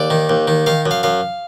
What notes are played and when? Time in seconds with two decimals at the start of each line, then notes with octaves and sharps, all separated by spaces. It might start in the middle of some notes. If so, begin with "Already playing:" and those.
Already playing: D#2 D5
0.10 D#3
0.29 D#2
0.48 D#3
0.66 D#3 F5
0.86 F#2
0.91 F5
1.03 F#2 F5